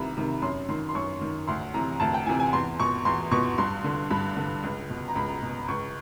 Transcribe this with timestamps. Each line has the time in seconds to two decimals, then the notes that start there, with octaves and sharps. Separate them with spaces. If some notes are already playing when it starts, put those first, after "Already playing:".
Already playing: C2 C3 D#3 A#5 B5
0.17 C3 D#3
0.42 F#2 C6
0.69 D#3 C6
0.89 C6
0.95 F#2 C#6
1.21 D#3
1.48 D2 C6
1.74 C3 E3 A#5
2.00 D2 A5
2.14 G5
2.26 C3 E3 G#5
2.40 G#5
2.53 E2 C6
2.80 B2 C#6
3.05 E2 C6
3.31 B2 C#6
3.58 G2 C6
3.84 D3
4.10 G2 B5
4.37 D3
4.63 C#2
4.90 B2
5.08 A#5
5.15 C#2 B5
5.43 B2
5.68 C#2 C#6